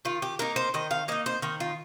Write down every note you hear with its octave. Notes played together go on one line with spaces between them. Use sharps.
D#3 F4
G4
A#3 D#4 A#4
C5
D#3 D#5
F5
A#3 D#4 D#5
C5
D#3 A#4
F4